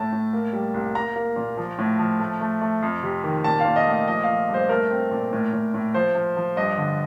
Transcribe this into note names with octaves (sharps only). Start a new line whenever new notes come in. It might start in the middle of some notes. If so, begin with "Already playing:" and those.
Already playing: A2 A3 A5
A2
A#3
G3
C2
A#3 A#5
A#3
A#2
F3
A2
F3
A3
A3
A3
F2
C3
D#3
A#2 A5
F5
A#2
D#5
A3
D#5
F3 D#5
F3 F5
G2
C5
A3 A#4
C4
A#2
A2
A2
A2
F3 C5
F3
F3
G2 D#5
D3